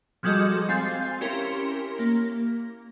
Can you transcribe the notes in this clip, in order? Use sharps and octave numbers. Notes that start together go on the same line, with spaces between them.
F3 G3 G#3 F#4 A4 D#5
C4 F5 G#5 C6 G6 A6
C#4 E4 G4 A#4 C6 B6
A#3